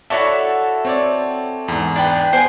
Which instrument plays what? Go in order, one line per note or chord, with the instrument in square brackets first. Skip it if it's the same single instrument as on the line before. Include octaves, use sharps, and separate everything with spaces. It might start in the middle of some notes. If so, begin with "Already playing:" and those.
[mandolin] E4 F#4 A4 [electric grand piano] C#5 D5 E5
[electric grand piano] C4 C#5 D5
E2 G#2
[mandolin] D4 B4 G5
[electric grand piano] B3 [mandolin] C5 G5 G#5